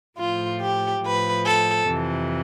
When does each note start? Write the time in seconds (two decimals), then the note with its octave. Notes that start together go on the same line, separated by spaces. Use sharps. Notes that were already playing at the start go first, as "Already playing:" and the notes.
0.18 A2 F3 F4
0.61 G4
1.04 A2 F3 B4
1.45 A4
1.88 F2 C3 E3